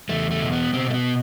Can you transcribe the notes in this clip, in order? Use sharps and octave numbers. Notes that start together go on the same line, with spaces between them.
E2 A3
A3
B2
B3
B2 C4
A3
B3